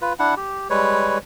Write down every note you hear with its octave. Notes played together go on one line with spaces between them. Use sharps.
F4 B4
D4 E4 F#5
G4
G3 G#3 B4 C#5